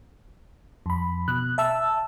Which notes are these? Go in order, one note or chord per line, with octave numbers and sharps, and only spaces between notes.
F2 B5
B2 F#6
E5 A5 E6